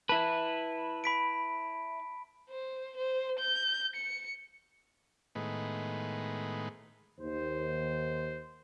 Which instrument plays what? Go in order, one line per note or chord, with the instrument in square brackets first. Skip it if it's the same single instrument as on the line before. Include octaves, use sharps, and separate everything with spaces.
[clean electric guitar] E4 B4 [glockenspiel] A5
[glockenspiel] B5 B6 D7
[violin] C5
C5
G6
C#7
[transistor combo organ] A2 D#3 G#3 B3
[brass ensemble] D#2 C5